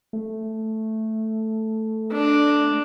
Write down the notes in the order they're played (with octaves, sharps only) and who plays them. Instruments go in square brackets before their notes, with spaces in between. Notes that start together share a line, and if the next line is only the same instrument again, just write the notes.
[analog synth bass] A3
[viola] D4